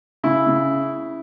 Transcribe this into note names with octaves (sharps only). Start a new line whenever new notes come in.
C#3 E4
C#3